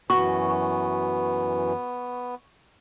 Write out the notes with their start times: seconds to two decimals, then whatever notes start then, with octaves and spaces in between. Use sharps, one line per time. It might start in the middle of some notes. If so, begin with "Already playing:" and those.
0.10 F#2 E3 B3 F#4 C#6